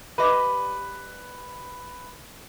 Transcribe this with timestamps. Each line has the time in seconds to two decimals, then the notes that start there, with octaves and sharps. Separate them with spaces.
0.18 G3 G4 B4 D#5